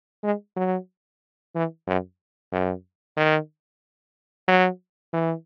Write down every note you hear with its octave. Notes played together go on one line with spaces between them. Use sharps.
G#3
F#3
E3
F#2
F#2
D#3
F#3
E3